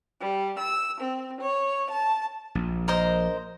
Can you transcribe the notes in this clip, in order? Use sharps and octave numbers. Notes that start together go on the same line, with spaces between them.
G3
E6
C4
C#5
A5
A#1
A#4 C5 D#5